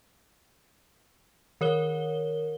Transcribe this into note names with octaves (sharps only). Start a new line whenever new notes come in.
D#3 A#4 C#5 G7